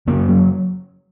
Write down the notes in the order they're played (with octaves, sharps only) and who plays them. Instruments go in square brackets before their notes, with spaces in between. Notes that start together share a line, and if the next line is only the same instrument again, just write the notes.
[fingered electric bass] F#2 C#3 A#3
F#3